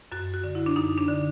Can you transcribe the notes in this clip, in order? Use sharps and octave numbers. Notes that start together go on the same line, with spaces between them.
F#2 F#4
F#4
D3
E4
D4
F#2 D#4
D4
D3